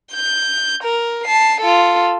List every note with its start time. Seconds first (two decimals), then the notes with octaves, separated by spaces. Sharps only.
0.13 G6
0.83 A#4
1.25 A5 C7
1.61 F4 A4